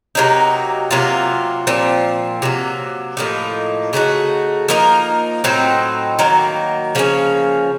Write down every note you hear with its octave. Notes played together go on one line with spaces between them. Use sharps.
C3 F#3 A#3 D#4
C3 F#3 A#3 F4
A#2 F3 C4
C3 F#3 A#3
A2 F3 A#3 D#4
C#3 A3 D#4 F#4
F3 A#3 D#4 A#4
A2 F#3 C4 D#4
D#3 F#3 A#3
C#3 F3 A#3 C#4